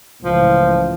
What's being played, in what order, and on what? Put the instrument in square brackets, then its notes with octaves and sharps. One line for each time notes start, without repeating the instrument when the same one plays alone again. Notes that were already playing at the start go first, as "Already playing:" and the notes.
[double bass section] C#2 A2 E3 [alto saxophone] F3